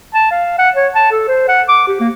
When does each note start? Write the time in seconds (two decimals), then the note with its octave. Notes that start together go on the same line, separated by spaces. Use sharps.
0.14 A5
0.31 F5
0.58 F#5
0.75 C#5
0.95 A5
1.11 A4
1.28 C5
1.48 F#5
1.68 D6
1.88 G4
2.00 A#3